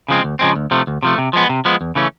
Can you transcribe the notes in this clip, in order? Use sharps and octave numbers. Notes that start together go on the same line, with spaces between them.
C#3 F3 G#3 C4
D2
C#3 F3 G#3 C4
D2
C3 F3 A3
D2
C3 F3 A3
C3
F3 G#3 B3
C3
F3 G#3 B3
E2
C#3 E3 A3 C#4